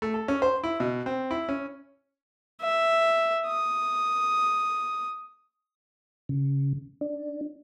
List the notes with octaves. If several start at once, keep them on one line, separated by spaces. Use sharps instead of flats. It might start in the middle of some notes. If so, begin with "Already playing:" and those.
A3
A4
C#4
C5
E4
B2
C4
E4
C#4
E5
D#6
C#3
D4